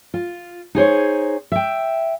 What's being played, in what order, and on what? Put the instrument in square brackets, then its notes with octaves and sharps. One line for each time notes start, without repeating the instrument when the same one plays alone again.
[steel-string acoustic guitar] F4
D#4 G#4 C5 C#5
E5 G5